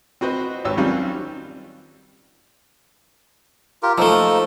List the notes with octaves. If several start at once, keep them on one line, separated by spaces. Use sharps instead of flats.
C4 F#4 B4 C5 D#5
G#1 F#4 G4 B4 C#5 E6
D#3 F#3 G3 C4 C#4 F4
F4 G4 A#4
F3 A3 A#3 D#4 A4